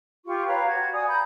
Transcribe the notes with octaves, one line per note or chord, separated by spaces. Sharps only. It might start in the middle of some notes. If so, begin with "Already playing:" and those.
F4 G4 C#6
B4 C#5 F5 A#5
F#4 G#6
D5 G#5 D#6
A#5 B5 G6